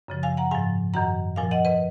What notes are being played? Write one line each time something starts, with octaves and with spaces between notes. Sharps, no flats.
F#2 C#3 F3
F5 G#5
F#5 A#5
G#2 F3 F5 G#5
F#2 D#3 F#5 A#5
A#2 F3 F5 G#5
D#5 F#5
B4 D#5